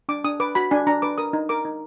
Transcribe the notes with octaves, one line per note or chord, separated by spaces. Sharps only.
D4 D6
D4 D#6
B4 D6
F#4 B5
D4 G#5
D4 A#5
B4 D6
A#4 D#6
D#4
A#4 D6
D#4